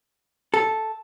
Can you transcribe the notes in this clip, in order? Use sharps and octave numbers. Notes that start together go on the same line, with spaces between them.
A4